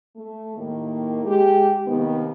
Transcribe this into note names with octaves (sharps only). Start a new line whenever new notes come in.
A3
D#2 A2 D#3 A#3
G#3 G4
D#2 C3 D#3 B3